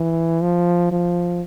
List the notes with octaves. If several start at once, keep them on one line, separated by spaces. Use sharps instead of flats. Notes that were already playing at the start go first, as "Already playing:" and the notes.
Already playing: E3
F3
F3